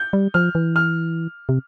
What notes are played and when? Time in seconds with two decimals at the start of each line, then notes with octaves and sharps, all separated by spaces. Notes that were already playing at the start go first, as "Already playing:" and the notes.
Already playing: G6
0.13 G3
0.34 F3 F6
0.55 E3
0.76 F6
1.49 C3